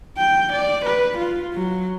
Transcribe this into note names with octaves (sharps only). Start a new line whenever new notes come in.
G5
D5
B4
F4
F#3